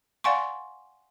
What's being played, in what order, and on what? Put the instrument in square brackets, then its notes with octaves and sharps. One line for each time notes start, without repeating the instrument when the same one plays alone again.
[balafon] D5 F5 F#5 G#5 C6 C#6